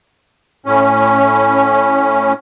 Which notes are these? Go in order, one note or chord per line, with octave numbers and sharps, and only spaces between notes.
A2 C#4